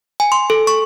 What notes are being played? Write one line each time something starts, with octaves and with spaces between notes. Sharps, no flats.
G#5
C6
A4
C#6